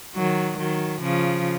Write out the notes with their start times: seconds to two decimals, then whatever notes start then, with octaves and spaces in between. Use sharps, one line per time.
0.15 D#3 F#3
0.58 D#3 F#3
1.01 C#3 F3